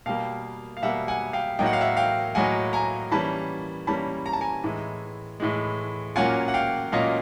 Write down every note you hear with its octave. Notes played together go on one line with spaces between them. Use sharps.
B2 G3 A#3 F5 G5
F5
B2 G3 A#3 E5 F#5
F#5 G#5
F5 G5
A2 F#3 A#3 D#4 G5
F#5
F5
E5 F#5
F5 G5
A2 F#3 A#3 D#4 F#5 G#5
G#5 A#5
E3 G3 A#3 C#4 A5 B5
E3 G3 A#3 C#4 A5 B5
A#5
A5
G#5 A#5
A2 E3 G#3
A2 E3 G#3
A#2 F#3 A#3 C#4 F4 F#5 G#5
F#5
F5 G5
A#2 F#3 A#3 C#4 F4 D#5 F5